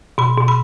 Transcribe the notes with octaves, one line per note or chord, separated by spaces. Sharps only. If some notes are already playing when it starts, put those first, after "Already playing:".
B2 B5
B2
B5